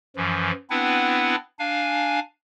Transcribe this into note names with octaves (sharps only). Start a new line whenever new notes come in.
F#2 E3 F3
B3 C4 D4 E4 B4 F#5
D4 F5 G#5